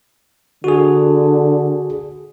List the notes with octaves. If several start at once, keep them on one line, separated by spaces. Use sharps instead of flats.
D3 F#4 G#4